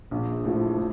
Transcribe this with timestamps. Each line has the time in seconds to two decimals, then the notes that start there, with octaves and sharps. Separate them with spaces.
0.11 A#1
0.45 A2 F3
0.78 A2